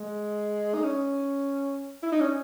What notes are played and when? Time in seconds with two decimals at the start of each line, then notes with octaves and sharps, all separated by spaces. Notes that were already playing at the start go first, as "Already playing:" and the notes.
Already playing: G#3
0.74 D#4
0.83 C#4
2.03 E4
2.12 D#4
2.20 C#4